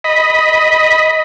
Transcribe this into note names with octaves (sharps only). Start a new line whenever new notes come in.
D#5 B5